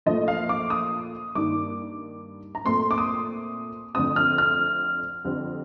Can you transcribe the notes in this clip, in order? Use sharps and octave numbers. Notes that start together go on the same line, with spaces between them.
A#2 F3 A3 D#5
F5
D6
D#6
G2 D#3 A#3 D6
A#5
A#2 A3 C4 C6
D6
D#6
F2 D3 A3 C4 D#6
F6
F6
F2 D3 G3 C4